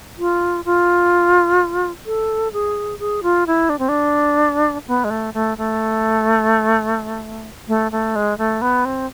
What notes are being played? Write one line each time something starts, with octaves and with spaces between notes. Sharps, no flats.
F4
F4
A4
G#4
G#4
F4
E4
D4
C4
D4
B3
G#3
A3
A3
A3
A3
A3
G#3
A3
B3
C4